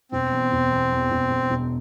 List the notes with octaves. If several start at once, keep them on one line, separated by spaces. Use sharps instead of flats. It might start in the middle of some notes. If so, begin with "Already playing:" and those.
E1 C4
E2
E1
E2
E2
E1
E1
E1